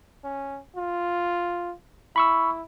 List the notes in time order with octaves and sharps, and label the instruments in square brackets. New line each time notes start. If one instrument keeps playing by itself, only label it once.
[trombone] C#4
F4
[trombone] E4 [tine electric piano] B5 C#6 E6